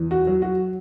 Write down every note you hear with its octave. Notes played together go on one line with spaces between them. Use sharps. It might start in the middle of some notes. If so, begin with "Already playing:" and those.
Already playing: E2
F#4
F#3
F#4